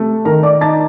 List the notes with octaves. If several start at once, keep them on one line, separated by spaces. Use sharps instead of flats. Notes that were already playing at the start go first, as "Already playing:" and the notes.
Already playing: C3 A3
D#3 A#4 A#5
D5 D6
D#4 A5 A6